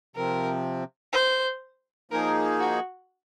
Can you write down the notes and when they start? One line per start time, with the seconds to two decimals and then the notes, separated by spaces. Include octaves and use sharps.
0.16 C3 F3 C4 A#4
1.13 C5
2.11 F3 A#3 D#4 G#4 A#4
2.60 F#4